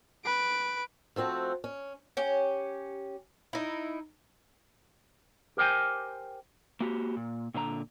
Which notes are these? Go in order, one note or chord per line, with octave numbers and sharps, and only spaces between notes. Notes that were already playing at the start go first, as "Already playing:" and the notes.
B4 D7
F3 A3 C4 F#4
C#4
C#4 G4
D#4 E4
G4 A#4 C5 G5 G#5
A#3 F#4 G4
A#2
A#2 D3 C5 A#5